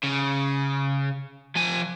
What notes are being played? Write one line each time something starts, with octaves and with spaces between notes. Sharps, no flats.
C#3
F3 G#5